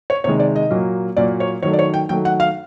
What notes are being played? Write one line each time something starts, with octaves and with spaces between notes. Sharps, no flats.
C#5
C3 D#3 G#3 C#5
D5
D#5
A#2 F#3 A#3
A#2 F#3 A#3 D5
C#5
D#3 F#3 A3 C#5
D5
C#5
G5
D#3 F#3 A3 G5
F#5
F5